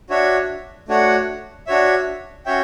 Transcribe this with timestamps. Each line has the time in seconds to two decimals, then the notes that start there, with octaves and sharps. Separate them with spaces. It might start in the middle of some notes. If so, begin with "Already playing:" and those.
0.09 D4 F#4 C#5 E5
0.88 A3 D4 F#4 C#5 F#5
1.67 D4 F#4 C#5 E5
2.46 C#4 F#4 C#5 E5 G5